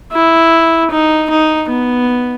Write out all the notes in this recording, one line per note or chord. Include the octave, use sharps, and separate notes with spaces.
E4
D#4
D#4
B3